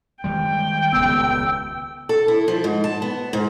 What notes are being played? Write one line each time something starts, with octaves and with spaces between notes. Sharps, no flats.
D#3 G3 G#3 G5
D#1 C#2 B3 E6
A4
E4
F3
G#2
A5
B3
G#2